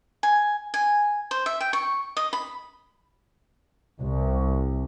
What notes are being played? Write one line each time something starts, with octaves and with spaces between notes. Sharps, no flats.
G#5
G#5
C5
E5
G5
C#6
D#5
B5
C2